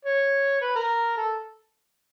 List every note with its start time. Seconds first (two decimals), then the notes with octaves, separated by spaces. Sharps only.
0.05 C#5
0.61 B4
0.75 A#4
1.17 A4